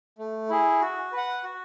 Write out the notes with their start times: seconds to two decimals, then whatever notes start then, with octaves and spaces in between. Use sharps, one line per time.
0.19 A3
0.50 E4 G#4
0.81 F#4
1.12 B4
1.17 F#5
1.44 F#4